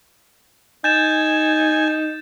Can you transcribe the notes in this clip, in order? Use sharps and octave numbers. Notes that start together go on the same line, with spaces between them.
D#4 G#5 G6 A6 E7